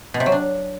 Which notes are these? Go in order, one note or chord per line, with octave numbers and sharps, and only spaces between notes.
B2
C3
F#3
D4